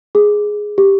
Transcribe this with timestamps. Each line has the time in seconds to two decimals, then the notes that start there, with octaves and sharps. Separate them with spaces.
0.15 G#4
0.78 G4